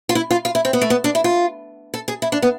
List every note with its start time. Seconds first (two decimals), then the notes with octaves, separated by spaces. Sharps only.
0.09 F4
0.15 E4
0.31 F4
0.45 F4
0.55 E4
0.65 C4
0.73 B3
0.81 A3
0.90 B3
1.04 D4
1.15 E4
1.24 F4
1.94 A4
2.08 G#4
2.22 E4
2.32 D4
2.42 B3